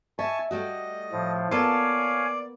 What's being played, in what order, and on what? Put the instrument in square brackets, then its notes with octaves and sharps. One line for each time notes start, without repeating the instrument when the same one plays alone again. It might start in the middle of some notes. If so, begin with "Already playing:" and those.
[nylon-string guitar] D#5 E5 [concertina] G#5 A5 C#6
[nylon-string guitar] G3 A3 F#4 [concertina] D#5
[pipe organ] A2 F3
[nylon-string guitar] A#3 B3 [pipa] F4 A4 [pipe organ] C#5 F5 G#5 [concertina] D5